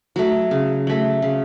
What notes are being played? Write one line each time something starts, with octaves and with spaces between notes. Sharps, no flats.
F#3 A3
C#3
F#3 A3
C#3